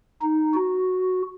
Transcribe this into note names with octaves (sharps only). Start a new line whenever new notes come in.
D#4
F#4